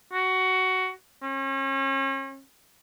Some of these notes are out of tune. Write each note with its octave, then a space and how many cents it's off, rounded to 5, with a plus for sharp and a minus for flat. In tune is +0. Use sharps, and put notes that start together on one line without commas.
F#4 +15
C#4 -35